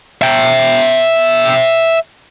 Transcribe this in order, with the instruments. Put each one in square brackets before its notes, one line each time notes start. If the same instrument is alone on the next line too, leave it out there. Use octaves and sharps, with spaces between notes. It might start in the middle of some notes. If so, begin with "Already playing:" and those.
[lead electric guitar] E5 G5